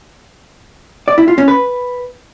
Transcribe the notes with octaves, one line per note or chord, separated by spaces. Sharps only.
D5
E4
F4
C#4
B4